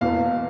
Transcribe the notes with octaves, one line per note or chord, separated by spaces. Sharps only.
E1 E2 B2 B3 F5